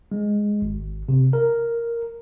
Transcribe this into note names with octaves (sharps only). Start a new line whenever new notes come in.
G#3
G#1
C3
A#4